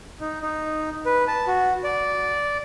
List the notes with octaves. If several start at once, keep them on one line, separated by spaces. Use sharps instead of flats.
D#4
D#4
B4
A5
F#4
D5